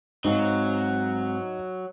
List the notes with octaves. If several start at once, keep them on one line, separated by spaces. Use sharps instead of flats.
G#2 F#3 C4 D#4 F5